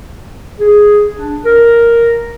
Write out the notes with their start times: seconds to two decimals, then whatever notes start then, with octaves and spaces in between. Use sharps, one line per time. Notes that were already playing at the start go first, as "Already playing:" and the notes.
0.59 G#4
1.17 D4
1.45 A#4